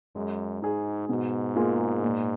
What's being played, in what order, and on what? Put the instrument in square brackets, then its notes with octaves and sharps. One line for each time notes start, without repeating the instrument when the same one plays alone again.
[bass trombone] F#2 [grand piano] G#3
[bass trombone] G#2 [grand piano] D#4 G#4
[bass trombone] G#2 [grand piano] B2
[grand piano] A#3 F4 G#4
A#2